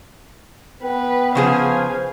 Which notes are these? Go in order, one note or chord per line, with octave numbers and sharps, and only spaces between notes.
B3 B4 G5
C#3 F3 G#4 C5 F5 G#5